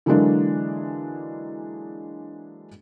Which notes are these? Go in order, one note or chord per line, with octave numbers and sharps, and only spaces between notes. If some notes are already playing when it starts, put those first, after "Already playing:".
D3 E3 F#3 G#3 A#3 D4